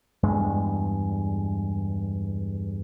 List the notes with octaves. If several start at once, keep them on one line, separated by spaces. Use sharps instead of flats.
E2 G2 G#3